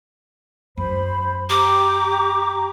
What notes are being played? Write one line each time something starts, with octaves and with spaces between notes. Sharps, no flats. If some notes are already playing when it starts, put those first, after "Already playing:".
F#2 C5 B5
G4 A#5 D6